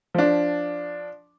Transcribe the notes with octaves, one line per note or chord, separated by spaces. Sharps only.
F3 D4